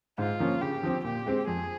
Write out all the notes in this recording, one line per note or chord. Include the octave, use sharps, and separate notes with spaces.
G#2 F4
F3 A#3 C#4
C#3 G4
F3 C4
A#2 G4
G#3 C4
F2 G#4